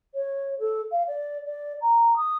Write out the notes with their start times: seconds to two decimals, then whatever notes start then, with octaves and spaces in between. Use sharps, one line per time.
0.14 C#5
0.59 A4
0.91 F5
1.07 D5
1.45 D5
1.81 A#5
2.16 D#6